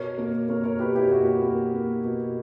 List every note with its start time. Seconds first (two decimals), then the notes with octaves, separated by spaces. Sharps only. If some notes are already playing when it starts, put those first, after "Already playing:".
Already playing: B2 A#4 C#5
0.18 A#3
0.49 A#3 A#4 C#5
0.64 A#4 C#5
0.79 B2 G4 B4
0.95 E4 G4
1.10 A#3 F#4 A#4
1.42 A#3
1.73 A#3
2.04 B2